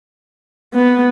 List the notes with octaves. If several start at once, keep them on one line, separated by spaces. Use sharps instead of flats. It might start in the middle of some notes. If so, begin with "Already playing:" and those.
B3